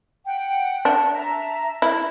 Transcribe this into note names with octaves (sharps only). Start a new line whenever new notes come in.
F#5 G5
D4
E5 A5 A#5
E4